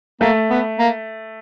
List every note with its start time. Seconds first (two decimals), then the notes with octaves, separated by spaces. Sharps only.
0.21 A3 A#3
0.50 B3
0.79 A#3